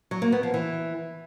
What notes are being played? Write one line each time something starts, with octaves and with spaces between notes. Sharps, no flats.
F#3
A#3
B3
F3
E3